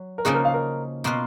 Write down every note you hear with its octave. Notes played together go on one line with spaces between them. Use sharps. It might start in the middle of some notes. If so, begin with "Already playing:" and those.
Already playing: F#3
A#4
C#3 F3 A#3 D#4 F#4 G#4
A#4
F5
A#4
B2 A#3 F4 B4